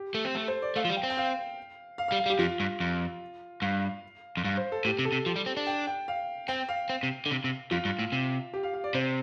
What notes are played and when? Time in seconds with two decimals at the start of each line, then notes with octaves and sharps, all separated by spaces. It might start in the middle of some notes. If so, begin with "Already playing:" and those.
Already playing: G4
0.15 A3
0.25 C4
0.35 A3 A4
0.48 C5
0.62 D5
0.76 A3 F5
0.85 F3
0.89 G3
0.97 G5
1.03 C4
1.10 G5
1.17 F5
1.98 F5
2.08 F5
2.12 G3
2.18 F5
2.26 G3
2.30 G4
2.39 F2 F4
2.60 G2
2.80 F2
3.62 G2 F5
4.37 F2
4.44 G2 F5
4.57 C5
4.72 A4
4.85 A2 G4
4.99 C3
5.05 A4
5.12 C3
5.26 F3 G4
5.36 G3
5.46 C4
5.57 D4
5.67 G5
5.87 G5
6.08 F5
6.48 C4 G5
6.69 F5
6.90 C4
7.03 C3
7.26 D3
7.30 C3
7.44 C3
7.71 F2 F4
7.85 G2
7.99 A2
8.12 C3
8.54 G4
8.63 F5
8.74 F5
8.84 D5
8.95 C3 C5